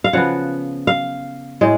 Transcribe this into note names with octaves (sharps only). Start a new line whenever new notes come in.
F5
C#3 F3 B3 F#5
F5
A2 G#3